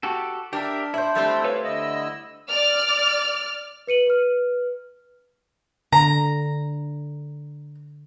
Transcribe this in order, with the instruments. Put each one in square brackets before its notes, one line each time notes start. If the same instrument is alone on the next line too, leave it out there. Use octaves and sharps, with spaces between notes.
[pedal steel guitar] F#4 G4 A4
[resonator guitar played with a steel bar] D4 [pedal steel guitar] G4 A#4 E5
[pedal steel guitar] E4 G6 [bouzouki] C5 E5
[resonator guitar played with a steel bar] G3 A3 C4 [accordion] D4 E6
[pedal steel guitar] B4 C#5 F5
[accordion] D3 D#5 E6 [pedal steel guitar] E4
[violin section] D5 F6
[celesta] B4 C#7 D#7 F#7
B4 F6
[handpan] D3 [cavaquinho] A#5